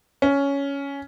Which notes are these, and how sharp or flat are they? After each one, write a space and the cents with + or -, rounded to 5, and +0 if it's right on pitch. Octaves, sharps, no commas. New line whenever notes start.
C#4 +10